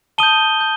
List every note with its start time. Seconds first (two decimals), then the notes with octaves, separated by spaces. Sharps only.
0.18 A5 D#6 G6 D#7 G7
0.60 A5 D#6 G6